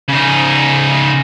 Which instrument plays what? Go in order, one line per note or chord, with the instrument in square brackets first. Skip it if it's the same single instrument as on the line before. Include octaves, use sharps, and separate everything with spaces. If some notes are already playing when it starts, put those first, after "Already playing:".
[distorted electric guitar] C#3 D#4